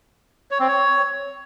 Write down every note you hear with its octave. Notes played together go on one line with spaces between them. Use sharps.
C#5
C4
C#5